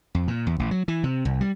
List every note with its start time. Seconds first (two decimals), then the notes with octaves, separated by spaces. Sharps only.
0.15 F2
0.28 A#2
0.47 E2
0.59 A1
0.71 F#3
0.88 E3
1.04 C3
1.25 C2
1.41 G3